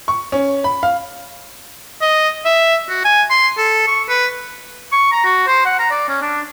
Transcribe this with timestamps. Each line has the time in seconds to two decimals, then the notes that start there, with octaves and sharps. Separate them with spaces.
0.08 C#6
0.32 C#4
0.64 B5
0.83 F5
2.01 D#5
2.45 E5
2.89 F#4
3.05 G#5
3.30 C6
3.57 A4
3.87 C#6
4.09 B4
4.92 C#6
5.12 A#5
5.25 F#4
5.47 C5
5.66 F#5
5.79 A#5
5.91 D5
6.09 C#4
6.22 D4